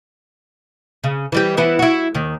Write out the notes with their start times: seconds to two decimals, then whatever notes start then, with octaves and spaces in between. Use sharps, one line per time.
1.04 C#3
1.32 E3 G3 G4
1.57 E3 B3 E4
1.79 E4 F#4
2.14 D#2 D#3